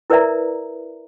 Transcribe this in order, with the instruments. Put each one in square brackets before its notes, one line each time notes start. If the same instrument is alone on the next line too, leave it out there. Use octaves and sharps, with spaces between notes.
[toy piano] E4 A#4 B4 D5 E5 A#5